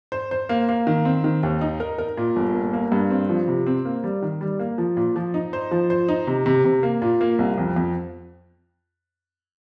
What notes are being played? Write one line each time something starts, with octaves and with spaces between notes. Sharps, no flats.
C5
C5
A#3
A#3
D#3
C4
D#3
D#2
D#4
A#4
A#4
A#2
G1
A#3
A#3
G2
C4
F3
C3
C4
A#3
G3
D#3
G3
A#3
F3
A#2
F3
D#4
C5
F3
C5
D#4
C3
C3
C3
A#3
A#2
A#3
C2
F2
F2